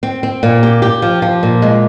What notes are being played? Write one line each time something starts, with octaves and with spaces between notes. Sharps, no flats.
C4
C4
A#2
G4
G4
F3
F3
A#2
G#3